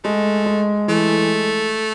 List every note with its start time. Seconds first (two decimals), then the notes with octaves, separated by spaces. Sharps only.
0.04 G#3 A3
0.46 G#3
0.88 E3 A3